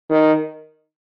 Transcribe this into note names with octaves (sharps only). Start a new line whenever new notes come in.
D#3